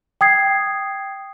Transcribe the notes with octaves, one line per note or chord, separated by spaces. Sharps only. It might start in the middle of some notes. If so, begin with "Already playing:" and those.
G5 D#6 G#6 C7